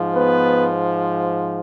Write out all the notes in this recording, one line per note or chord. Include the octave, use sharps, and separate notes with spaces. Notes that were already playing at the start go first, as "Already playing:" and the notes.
Already playing: G#2 F3
B3 B4